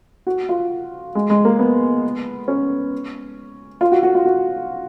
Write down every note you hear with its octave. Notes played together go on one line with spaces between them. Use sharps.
F#4
F4
G#3
G#3
A#3
B3
C#4
F4
F#4
F#4
F4
F#4